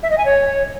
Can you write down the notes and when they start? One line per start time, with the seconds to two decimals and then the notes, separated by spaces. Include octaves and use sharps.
0.03 E5
0.10 D#5
0.18 G#5
0.25 C#5